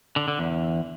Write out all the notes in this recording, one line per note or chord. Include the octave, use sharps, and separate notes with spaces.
D3
D3
E2